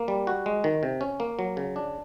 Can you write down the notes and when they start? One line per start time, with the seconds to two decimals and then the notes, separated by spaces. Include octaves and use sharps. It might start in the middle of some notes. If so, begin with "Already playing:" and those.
Already playing: A#3
0.08 G3
0.27 F#4
0.46 G#3
0.64 D#3
0.83 C3
1.01 C#4
1.20 A#3
1.39 F#3
1.57 C#3
1.76 D4